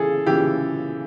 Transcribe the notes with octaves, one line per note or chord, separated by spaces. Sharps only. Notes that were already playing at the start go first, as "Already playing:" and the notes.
Already playing: C#3 E3 G#4 A4
C#3 E3 G4